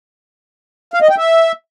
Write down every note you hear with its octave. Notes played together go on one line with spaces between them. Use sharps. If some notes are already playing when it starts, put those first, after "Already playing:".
F5
D#5
G5
E5